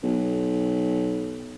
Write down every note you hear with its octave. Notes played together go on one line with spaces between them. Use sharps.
B1